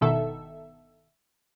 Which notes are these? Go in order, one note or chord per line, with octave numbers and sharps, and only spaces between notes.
G1 B2 D#3 A4 E5